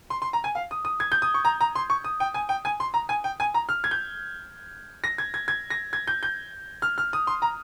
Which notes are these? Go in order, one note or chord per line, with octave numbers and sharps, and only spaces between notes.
C6
C6
A#5
G#5
F5
D#6
D#6
G#6
G6
D#6
C#6
A#5
A#5
C6
C#6
D#6
G5
G#5
G5
G#5
C6
A#5
G#5
G5
G#5
A#5
F6
G#6
G6
A#6
G#6
G#6
G#6
A#6
G#6
G6
G6
F6
F6
D#6
C6
A#5